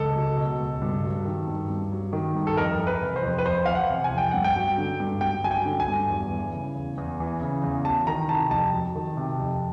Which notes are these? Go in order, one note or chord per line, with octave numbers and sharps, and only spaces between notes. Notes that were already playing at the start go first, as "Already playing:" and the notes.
Already playing: C#2 A4
F#3
B2
C#2
G2
F#3
D#3
G2
G2
F#3
D#3
G2
A4
F2 A#4
E3
B4
C3
C5
F2
B4
F2 C5
E3 F5
F#5
C3
G#5
F2
G5
G2 F#5
G5
F#3
D3
G2
G2 G5
F#3 G#5
G5
D3
G#5
G2
E2
E3
C#3
E2
E2
E3
C#3
E2
F#3 A5
D#3 A#5
C3 A5
F2 A5
F#3
D#3
C3
F2